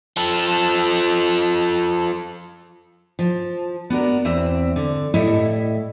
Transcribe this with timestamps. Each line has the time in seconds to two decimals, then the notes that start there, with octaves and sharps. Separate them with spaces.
0.17 F3 A4
3.19 F3
3.90 B3 D4 F#4 A#4
4.25 E2 C4 E5
4.76 D3
5.14 A2 G3 E4 A4 D#5 E5